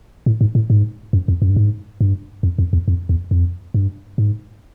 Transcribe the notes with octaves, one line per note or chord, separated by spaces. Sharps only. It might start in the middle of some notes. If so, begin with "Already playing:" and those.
A2
G#2
A2
G#2
F#2
F2
F#2
G2
G#2
G2
F2
F2
E2
F2
E2
F2
G2
G#2